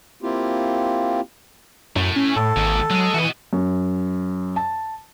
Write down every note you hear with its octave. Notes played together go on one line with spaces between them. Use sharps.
A#3 C4 E4 F4 G4
F#2 A2
C#4
A2 A4
G#1 D#2
F#3 G#3 G#4
E3 F#4 D#5
F#2
A5